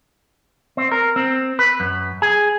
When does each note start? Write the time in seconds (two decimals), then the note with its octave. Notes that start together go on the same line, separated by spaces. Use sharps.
0.77 C4
0.92 A#4
1.16 C4
1.59 B4
1.80 F#2
2.22 G#4